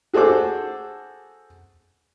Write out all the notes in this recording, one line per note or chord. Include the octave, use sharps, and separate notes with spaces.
F#4 G#4 A4 C5 D6